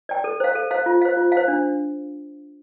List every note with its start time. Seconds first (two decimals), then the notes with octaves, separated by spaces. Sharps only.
0.09 D5 G5
0.24 A4
0.40 C5 F5
0.55 A4
0.71 C5 F5
0.86 F4
1.02 C5 F5
1.17 F4
1.32 C5 F5
1.48 D4